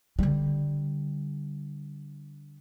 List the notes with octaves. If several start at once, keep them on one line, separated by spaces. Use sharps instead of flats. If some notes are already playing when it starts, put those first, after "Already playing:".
D3 G3